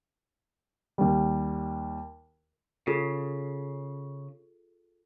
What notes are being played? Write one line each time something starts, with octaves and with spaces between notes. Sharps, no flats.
D#2 G3
C#3 F4 G#4 A4